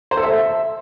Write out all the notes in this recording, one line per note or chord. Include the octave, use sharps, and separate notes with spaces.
C5
A4
E5